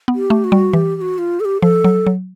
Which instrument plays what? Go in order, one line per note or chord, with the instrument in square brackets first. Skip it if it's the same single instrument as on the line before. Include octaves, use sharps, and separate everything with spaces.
[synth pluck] B3
[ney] G4
[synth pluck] A3
[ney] F#4
[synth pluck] G3
[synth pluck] E3 [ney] G4
[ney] G4
F#4
F4
A4
G4
[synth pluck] F3 [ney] A4
[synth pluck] F#3
F#3